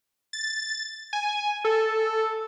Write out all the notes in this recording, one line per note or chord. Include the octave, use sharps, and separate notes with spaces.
A6
G#5
A4